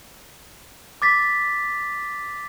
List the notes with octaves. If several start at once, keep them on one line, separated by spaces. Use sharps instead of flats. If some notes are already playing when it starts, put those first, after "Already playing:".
D6 A6 B6